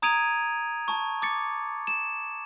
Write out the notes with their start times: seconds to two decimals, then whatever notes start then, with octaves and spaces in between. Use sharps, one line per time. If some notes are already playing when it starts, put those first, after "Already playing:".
0.02 A#5 D#6 G#6 D7 D#7 F7
0.88 A5 C#6
1.22 D6 A6 C#7
1.87 E7